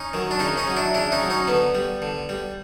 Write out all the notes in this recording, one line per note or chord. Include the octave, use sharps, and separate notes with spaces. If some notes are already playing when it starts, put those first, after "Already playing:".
Already playing: C#4 D#4
D#3 F#3
D4
C#3 C#4 D#4
C#4 D#4
F#3
D4 E4
C#3 D4 E4
C#4 D#4
F#3
C#4 D#4
D3 B3
G3
D3
G3